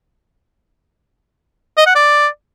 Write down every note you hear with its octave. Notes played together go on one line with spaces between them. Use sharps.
D#5
F#5
D5